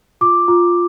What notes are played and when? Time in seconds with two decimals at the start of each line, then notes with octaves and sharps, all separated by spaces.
0.21 F4 D6
0.48 F4